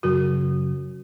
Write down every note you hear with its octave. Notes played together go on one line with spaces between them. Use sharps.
F#2 C#3 F#3 F#4 A#4